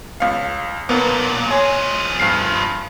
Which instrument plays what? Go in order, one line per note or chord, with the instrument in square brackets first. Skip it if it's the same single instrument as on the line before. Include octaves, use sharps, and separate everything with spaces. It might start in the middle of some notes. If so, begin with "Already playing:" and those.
[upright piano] C#2 F5
[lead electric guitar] B1 A#2 [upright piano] A#3 B3
[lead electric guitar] F3 G#4 [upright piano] C#5 G#5 C6
[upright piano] G2 F6 C7